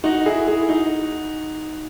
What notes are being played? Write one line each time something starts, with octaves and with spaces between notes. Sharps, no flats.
D#4 F#4
E4 G#4
E4 G#4
D#4 F#4